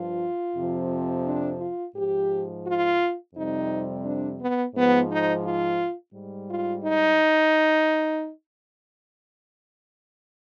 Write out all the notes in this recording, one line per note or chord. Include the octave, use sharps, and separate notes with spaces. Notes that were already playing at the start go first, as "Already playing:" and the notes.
Already playing: G2 F3 F4
F2 C3 F3
D4
F4
G#2 F3 G4
F4
F2 C3 G3 D#4
D4
B3
G#2 F3 B3
D#4
F4
G#2 G3
F4
D#4